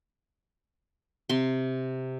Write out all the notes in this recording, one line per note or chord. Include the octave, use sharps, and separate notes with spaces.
C3 C6